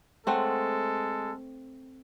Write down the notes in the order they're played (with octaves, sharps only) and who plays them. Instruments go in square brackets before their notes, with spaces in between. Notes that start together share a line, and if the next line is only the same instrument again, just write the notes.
[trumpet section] G#3 A4 [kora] A3 C4 F#5